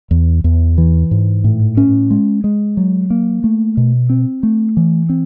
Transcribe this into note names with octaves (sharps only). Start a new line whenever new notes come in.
E2
E2
E3
G#2
A2
C#4
G#3
G#3
F#3
A#3
A3
B2
C4
A3
E3
C4